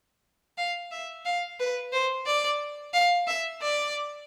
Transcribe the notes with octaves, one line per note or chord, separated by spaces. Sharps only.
F5
E5
F5
B4
C5
D5
F5
E5
D5